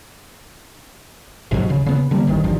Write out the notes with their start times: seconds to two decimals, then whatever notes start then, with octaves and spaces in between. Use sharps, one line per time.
1.51 G1 G#2 B2 F#3
1.69 D1 C#3
1.86 C#3 B3
2.11 D3 G3 A#3
2.27 A1 G2 D#3
2.44 G#1 G2 D#3 F3